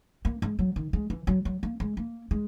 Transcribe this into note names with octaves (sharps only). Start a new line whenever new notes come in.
A#3
G#3
F#3
D#3
G#3
E3
F#3
F#3
A#3
G#3
A#3
G#3